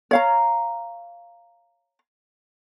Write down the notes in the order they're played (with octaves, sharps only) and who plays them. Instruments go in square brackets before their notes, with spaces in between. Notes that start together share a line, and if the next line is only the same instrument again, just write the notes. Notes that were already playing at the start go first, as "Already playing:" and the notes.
[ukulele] C#5 F5 A#5